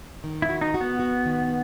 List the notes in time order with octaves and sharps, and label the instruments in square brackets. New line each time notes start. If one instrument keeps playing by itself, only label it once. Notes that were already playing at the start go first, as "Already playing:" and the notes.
[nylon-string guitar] D#3
[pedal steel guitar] E4
[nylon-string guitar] F#4
[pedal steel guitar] D#4
[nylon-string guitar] F#4
[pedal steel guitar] B3
[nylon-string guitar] F#4
D#3